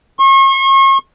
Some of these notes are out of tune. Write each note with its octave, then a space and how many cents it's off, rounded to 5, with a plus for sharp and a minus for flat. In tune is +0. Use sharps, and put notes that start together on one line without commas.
C#6 -40